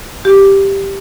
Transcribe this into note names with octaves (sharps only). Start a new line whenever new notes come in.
G4